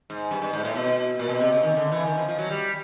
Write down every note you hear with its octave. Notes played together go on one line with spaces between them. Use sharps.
G#2
G2
G2
G#2
A2
B2
A#2
B2
C3
C#3
D#3
D3
E3
D#3
F3
F3
F#3
G3